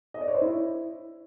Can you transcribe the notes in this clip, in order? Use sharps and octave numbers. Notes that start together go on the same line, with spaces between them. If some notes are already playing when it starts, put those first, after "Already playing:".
D#5
D5
C#5
C5
E4